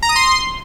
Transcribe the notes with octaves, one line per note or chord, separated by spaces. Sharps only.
A#5
D#6
C6